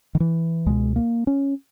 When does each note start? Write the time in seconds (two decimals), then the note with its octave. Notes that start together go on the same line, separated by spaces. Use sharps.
0.15 D#3
0.20 E3
0.66 C#2 B2 G#3
0.96 A#3
1.27 C#4